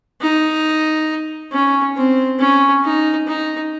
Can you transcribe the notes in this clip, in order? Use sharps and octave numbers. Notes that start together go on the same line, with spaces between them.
D#4
C#4
C4
C#4
D#4
D#4